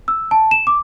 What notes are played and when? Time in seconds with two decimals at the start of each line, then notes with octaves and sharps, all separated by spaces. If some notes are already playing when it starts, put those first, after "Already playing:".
0.08 E6
0.31 A5
0.51 E7
0.67 D6